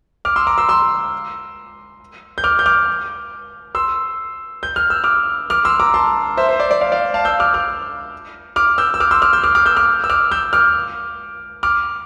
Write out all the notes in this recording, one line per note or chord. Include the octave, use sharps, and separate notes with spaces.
D6 F6
C6 E6
A#5 D6
C6 E6
C6 E6
G6
D6 F6
G6
D6 F6
C6 E6
G6
F6
E6
D6 F6
D6 F6
C6 E6
A#5 D6
A5 C6
C5 E5
C5
D5
D5
D5 F5
D5 F5
F5 A5
E6 G6
D6 F6
D6 F6
D6 F6
E6 G6
E6
D6 F6
C6 E6
D6 F6
E6 G6
D6 F6
D6 F6
E6 G6
D6 F6
E6
D6 F6
E6 G6
D6 F6
D6 F6